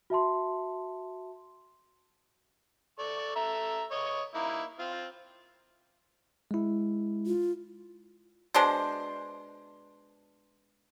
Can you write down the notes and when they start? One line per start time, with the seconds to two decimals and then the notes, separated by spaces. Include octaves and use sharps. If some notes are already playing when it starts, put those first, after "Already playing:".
0.10 F#4 E5 A5 C6
2.99 A4 D5 C#6
3.36 A4 E5 A#5
3.91 C#5 D#5 C#6
4.35 A#3 D#4 E4
4.79 C4 F4
6.51 G#3 E4
7.26 F4
8.54 B2 G#3 D4 C5